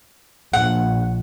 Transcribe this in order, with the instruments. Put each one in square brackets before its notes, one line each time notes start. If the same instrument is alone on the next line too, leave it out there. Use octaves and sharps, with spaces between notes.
[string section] A#1 [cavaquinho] F#5